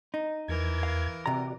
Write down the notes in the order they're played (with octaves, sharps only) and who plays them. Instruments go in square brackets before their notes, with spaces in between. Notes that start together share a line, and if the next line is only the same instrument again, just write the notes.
[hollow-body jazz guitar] D#4
[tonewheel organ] E2 G#6 [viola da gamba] E3 A#4
[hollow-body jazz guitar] F5
[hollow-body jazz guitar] C3 A#5 [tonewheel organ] F#4 D5